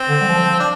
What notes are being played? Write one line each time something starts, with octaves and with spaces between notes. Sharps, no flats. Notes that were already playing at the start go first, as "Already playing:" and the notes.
Already playing: C4
D3
G3
F3
D4